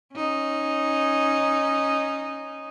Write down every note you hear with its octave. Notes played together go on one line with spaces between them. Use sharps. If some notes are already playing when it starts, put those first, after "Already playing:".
C#4 D#4